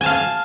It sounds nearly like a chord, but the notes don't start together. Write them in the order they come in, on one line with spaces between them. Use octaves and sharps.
G#5 A5 F5